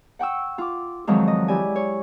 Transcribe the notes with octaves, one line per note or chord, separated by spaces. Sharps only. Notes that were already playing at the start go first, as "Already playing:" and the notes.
F#5 G5 C#6 E6
F4 D6
F2 D#3 F3 F#3 G#3 F4
D#5
E4 G4 D5 G#5
C#5